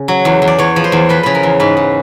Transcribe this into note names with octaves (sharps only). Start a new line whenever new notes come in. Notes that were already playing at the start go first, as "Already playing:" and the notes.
Already playing: C#3
F#3
E2
E2
D5
E2 C#5
F3
C5
E2
F3 B4
C#3 B4
A#4
E2
G#2 B4
G#2